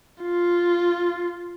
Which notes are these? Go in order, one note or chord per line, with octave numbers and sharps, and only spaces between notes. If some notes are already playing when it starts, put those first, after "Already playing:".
F4